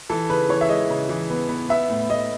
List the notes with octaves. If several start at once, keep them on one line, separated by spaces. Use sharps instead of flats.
E3 A4
C#3 B4
E3 C#5
E5
G#3 D#5
C#3
E3
B3
B3
B3 E5
A2
A2 D#5